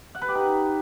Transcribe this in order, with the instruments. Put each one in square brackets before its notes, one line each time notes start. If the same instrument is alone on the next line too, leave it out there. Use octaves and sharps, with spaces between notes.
[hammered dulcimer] F#5
B4
G4
D#4